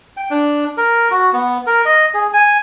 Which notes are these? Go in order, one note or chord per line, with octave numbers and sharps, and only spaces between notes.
G5
D4
A#4
F#4
B3
A#4
D#5
G#4
G#5